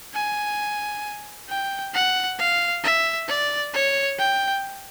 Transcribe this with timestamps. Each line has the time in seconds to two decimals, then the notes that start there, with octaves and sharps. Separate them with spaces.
0.14 G#5
1.49 G5
1.94 F#5
2.39 F5
2.84 E5
3.28 D5
3.74 C#5
4.19 G5